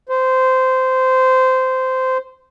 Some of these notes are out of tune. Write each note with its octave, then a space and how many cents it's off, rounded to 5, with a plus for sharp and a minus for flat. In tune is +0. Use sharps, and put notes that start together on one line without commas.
C5 -15